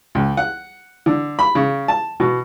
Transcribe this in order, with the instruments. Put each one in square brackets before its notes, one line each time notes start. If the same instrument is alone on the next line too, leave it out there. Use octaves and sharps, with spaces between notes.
[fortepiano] C#2
F#5
D3
B5
C#3
A5
B2